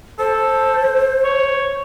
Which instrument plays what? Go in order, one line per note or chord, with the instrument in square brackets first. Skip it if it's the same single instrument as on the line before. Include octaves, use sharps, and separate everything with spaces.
[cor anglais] A4 [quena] C5
[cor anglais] C#5